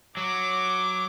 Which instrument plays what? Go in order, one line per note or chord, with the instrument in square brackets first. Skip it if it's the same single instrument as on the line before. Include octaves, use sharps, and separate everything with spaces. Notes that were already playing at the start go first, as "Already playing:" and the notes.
[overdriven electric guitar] F#3 [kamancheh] D6